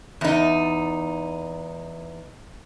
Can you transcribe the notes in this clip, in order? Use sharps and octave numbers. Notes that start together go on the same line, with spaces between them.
E2 D#4